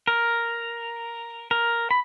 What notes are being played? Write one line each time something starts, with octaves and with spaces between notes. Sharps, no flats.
A#4
A#4
B5